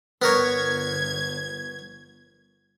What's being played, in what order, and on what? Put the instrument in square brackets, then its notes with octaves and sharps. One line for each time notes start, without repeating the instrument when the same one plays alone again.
[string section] G1 G#6 [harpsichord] B3 A#4 C#5